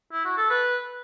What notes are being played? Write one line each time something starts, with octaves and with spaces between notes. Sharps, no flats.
E4
F#4
A4
B4